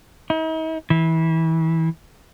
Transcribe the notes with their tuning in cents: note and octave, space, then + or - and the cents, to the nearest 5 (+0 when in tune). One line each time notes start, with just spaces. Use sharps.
D#4 +45
E3 -25